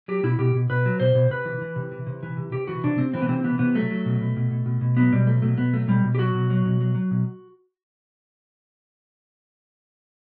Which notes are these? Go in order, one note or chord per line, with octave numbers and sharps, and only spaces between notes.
F#3 G4
B2 E4
B2 G4
B2
B2 B4
F#3
B2 C5
B2
C3 B4
E3
E3
C3
E3
C3
E3
C3
C3 G4
E3 F#4
C3 D4
C3 C4
E3 C4
B3
C3 C4
E3 B3
C3 B3
F#3 A3
F#3
B2
B2
B2
B2
B2
B2
F#3 B3
B2 G3
F#3 A3
B2 A3
B2 B3
F#3 A3
B2 G3
B2
G4
F#3 F#4
B2
F#3
B2
F#3
F#3
B2